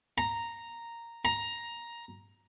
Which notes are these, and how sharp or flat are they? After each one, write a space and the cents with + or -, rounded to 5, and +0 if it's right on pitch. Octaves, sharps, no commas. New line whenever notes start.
A#5 -5
A#5 +10